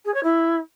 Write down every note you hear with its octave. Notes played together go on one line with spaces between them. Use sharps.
G#4
C#5
E4